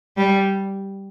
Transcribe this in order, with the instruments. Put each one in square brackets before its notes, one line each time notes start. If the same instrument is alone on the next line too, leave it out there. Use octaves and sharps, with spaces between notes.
[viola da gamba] G3